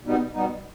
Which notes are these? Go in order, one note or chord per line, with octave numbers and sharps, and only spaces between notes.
B2 G3 B3 D#4
B2 G3 B3 D#4